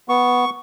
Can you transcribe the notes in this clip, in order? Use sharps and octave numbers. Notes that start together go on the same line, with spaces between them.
B3 C#6